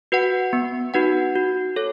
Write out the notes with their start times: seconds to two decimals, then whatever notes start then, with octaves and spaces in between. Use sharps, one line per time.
0.12 F#4 B4 F#5
0.53 B3
0.94 D#4 F#4 B4 F#5
1.35 F#4
1.76 A4 C#5